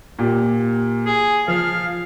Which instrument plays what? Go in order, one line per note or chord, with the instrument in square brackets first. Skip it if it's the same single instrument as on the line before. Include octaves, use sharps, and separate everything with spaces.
[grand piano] A#2 G4
[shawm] G#4
[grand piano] F3 [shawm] F5